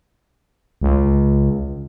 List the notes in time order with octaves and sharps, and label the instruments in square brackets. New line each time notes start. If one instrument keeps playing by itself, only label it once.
[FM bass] C#2